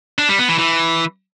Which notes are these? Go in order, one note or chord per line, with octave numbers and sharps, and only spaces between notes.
D4
G3
B3
E3
E3